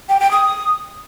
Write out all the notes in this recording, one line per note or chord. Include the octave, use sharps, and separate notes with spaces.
G5
G5
D#6